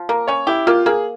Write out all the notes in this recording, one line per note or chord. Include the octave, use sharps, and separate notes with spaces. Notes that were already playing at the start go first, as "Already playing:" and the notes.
Already playing: F3
A#3 A#4
C#4 C#5
E4 G4
A#3 F4
A#3 G#4